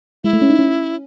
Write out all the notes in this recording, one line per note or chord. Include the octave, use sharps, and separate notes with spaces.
G#3 E4
A3
C#4
D#4
C#4